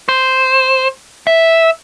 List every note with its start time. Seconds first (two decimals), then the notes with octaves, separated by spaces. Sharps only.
0.09 C5
1.27 E5